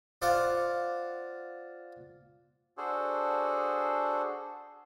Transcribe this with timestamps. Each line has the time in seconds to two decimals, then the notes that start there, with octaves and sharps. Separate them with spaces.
0.22 F4 C5 D5 F5 F#5
2.77 D4 F#4 G#4 A4 C5